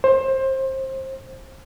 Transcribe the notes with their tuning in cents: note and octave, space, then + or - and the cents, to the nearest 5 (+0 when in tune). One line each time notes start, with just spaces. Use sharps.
C5 +25